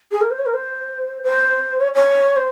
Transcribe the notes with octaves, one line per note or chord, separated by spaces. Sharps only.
G#4
A#4
C5
C#5
A#4
C5
C5
C#5
C#5
C5